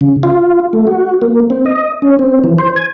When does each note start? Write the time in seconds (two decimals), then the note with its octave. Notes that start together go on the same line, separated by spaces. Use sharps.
0.01 C#3
0.23 F4
0.73 A3
0.87 F#4
1.22 A#3
1.50 C4
1.66 D#5
2.02 C#4
2.19 C4
2.44 E3
2.58 C5
2.76 G#5